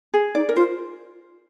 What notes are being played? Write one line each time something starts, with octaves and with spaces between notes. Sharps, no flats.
G#4
D#4 D5
A#4
F4 C5